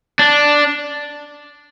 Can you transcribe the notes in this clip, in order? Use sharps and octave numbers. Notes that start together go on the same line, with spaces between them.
D4